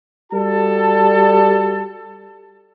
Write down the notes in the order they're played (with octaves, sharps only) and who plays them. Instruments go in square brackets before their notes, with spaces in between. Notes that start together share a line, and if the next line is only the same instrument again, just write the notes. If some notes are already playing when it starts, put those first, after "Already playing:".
[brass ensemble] G3 F#4 A4 A5